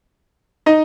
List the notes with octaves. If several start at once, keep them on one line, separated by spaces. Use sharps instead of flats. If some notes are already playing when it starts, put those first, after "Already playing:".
D#4 D#5